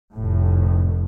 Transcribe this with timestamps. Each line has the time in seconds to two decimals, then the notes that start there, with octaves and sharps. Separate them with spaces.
0.14 F1 A2